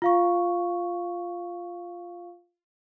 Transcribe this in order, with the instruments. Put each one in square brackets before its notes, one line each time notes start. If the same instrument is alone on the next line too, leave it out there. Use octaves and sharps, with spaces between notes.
[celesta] F4 F5 C#6